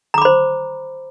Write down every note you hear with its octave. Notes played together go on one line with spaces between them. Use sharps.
C5 A#5 B5 D6